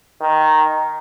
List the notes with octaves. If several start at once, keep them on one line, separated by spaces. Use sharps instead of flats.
D#3